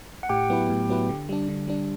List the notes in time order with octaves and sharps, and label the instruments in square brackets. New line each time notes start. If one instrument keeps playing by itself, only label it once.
[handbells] F#5
[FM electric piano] A2 [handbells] G4 G5
[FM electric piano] F#3 B3 E4 B4
A2
F#3 B3 E4 B4
D3
G3 D4
D3
G3 D4